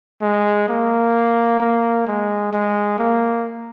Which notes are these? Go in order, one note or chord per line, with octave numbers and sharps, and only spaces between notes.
G#3
A#3
A#3
G#3
G#3
A#3